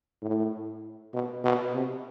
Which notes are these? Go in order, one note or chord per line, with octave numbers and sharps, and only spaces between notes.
A2
B2
B2
C3